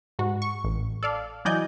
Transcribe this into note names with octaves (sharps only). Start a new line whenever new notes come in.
G#2 F#4
C#6
A1
A4 D5 F5
E3 F#3 D5 D#5 G#5 G6